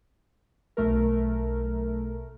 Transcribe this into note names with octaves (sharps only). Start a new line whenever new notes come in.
B1 A3 A#4